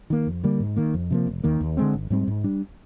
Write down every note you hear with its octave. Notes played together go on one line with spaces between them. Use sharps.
D#3 A#3
F2
D3 G3 A#3
G#2
D#3 A#3
F2
C3 F3 A#3
F1
D#2 D#3 A#3
D#2
D3 G#3 C4
G#1
G#2 G3 C4
G#2
G3 D4